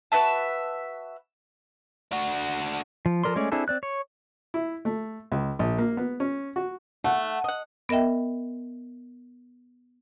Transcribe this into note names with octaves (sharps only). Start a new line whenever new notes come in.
F#4 B4 E5 A5
D4 F#4
F3
F3 A4 A#4 D5 C6
G#3 A3 C#4 D5
C4 D4 E4 G#4 A4
C4 D5 F#6
C#5
E4
A3
C#2
A#1
A#3
B3
C#4
F#4
A3 F#5
D#5 F#5
B3 A#4 D#5 E5 G5